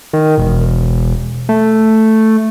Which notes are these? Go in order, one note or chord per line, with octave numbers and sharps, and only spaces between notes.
D#3
E1
A3